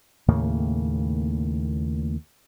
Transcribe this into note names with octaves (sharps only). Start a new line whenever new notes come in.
D#2 A2 C#3 A#3